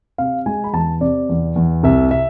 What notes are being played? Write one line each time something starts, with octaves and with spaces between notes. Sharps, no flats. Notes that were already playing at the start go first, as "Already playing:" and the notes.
C3 F5
G#3 G#5
B5
E2 A5
C3 D5
E2
E2
C2 E5
E5